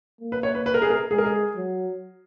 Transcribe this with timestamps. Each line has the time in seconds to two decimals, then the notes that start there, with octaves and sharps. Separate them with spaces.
0.21 A#3
0.32 B4
0.43 C#5
0.55 B4
0.66 B4
0.74 A#4
0.82 G#4
0.90 A#4
1.11 G#3 G#4
1.18 A#4
1.25 G#4
1.56 F#3